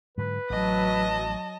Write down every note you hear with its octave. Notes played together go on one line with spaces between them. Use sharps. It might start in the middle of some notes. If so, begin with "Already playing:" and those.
G#2 D3 F#3 B4
A1 F#3 D#5 A5